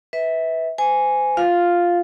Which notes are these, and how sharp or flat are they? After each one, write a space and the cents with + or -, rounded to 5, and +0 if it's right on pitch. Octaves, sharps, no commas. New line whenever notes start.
B4 +0 E5 -25
C5 -35 G#5 +0
F4 +0 F5 +0